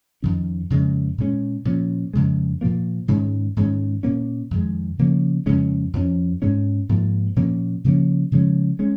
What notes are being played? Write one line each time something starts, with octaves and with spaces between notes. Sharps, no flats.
F2 D#3 C#4
F2 C#3 G#3
A#2 G#3 C#4
A#2 F3 C#4
F2 C#3 G#3
A#2 F3 A#3
G#2 D#3 G#3 C#4
G#2 D#3 G#3 C#4
A#2 A#3 C#4
F2 D#3 G#3
C#3 F3 A#3 C#4
F2 C#3 G#3 C#4
F2 F3 A#3 C#4
G#2 G#3 C#4
G#2 F3 A#3
A#2 F3 A#3 C#4
C#3 F3 A#3 C#4
C#3 F3 G#3 C#4
G#3 C#4